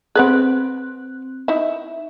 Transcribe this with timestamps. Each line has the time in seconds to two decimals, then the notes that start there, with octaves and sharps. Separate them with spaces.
0.15 C4 G#4 B4 F#5 F#6
1.48 D#4 E4 E5